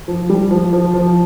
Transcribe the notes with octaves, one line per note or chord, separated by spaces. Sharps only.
F3
G3
F3
F3
F3